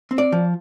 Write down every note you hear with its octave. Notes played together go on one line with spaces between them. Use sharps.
C4
D5
F3